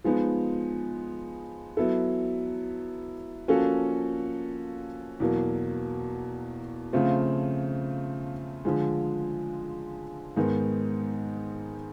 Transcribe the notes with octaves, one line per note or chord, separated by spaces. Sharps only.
F3 G#3 B3 D#4
F#3 B3 E4 A4
F3 A#3 C#4 F#4 A4
E2 B2 F#3 A#3
C#3 F3 A3 C4 F4
D3 F3 G#3
G#2 D#3 G#3 B3 D#4